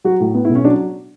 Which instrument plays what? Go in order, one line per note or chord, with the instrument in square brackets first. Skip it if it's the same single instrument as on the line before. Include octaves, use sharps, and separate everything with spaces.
[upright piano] F#3 [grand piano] F#4
[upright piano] A2
B3
[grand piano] E4
[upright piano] B1
[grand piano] C#4
[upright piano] F#3 [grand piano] D4